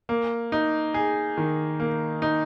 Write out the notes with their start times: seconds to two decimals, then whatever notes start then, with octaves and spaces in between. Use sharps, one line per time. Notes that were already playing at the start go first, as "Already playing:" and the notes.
0.09 A#3
0.52 D#4
0.94 G#4
1.38 D#3
1.80 A#3
2.22 D#4